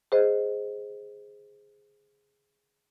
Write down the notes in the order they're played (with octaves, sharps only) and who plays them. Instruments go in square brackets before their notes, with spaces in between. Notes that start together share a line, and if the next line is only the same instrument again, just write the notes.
[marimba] G#4 C5 D#5